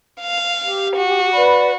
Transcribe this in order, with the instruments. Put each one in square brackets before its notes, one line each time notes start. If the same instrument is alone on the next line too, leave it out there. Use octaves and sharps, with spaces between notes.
[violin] F5
[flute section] G4
[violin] F#4
[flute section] B4 D5 B5